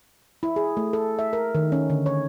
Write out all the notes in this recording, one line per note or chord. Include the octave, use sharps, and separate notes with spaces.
E4
G#4
A3
A4
E5
A#4
D#3
C#4
D3
C#5